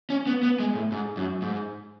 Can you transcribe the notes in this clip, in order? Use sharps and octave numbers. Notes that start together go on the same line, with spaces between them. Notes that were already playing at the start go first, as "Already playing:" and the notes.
C#4
B3
B3
G#3
A2
G#2
F#2
G#2